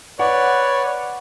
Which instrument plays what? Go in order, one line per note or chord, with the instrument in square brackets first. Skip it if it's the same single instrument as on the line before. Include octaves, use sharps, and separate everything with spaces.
[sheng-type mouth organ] B4 D5 [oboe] C#5 [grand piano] F#5